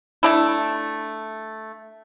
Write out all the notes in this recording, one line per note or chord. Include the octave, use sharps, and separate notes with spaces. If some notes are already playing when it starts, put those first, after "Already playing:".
A3 D4 E4